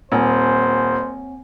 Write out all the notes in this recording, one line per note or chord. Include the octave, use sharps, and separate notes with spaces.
D#1 C4 C5 C#5 G#5